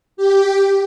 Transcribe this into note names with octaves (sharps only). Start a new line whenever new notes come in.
G4